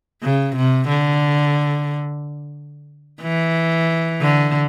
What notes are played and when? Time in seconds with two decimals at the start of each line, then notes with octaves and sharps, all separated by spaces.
0.22 C#3
0.56 C3
0.88 D3
3.22 E3
4.21 D3